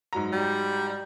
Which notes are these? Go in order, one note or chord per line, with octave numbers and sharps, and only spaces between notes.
G#2 F#3 A#5
G3